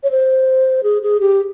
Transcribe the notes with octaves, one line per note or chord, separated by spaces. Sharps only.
C#5
C5
G#4
G#4
G4